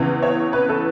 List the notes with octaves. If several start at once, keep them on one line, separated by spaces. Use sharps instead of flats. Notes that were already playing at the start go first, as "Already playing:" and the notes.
Already playing: E2 C#3 E3
C#5
B4
A4